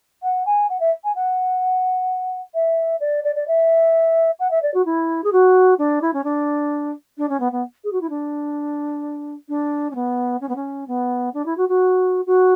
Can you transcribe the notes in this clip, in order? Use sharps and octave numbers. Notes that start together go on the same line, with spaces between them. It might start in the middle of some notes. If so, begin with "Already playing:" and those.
F#5
G#5
F#5
E5
G#5
F#5
E5
D5
D5
D5
E5
F#5
E5
D5
F#4
E4
G#4
F#4
D4
E4
C#4
D4
D4
C#4
B3
B3
G#4
F#4
E4
D4
D4
C#4
B3
C#4
B3
C#4
B3
D4
E4
F#4
F#4
F#4